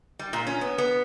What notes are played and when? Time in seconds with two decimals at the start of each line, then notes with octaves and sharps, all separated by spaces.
0.19 G3
0.33 A#2
0.47 C#4
0.61 B3
0.78 B3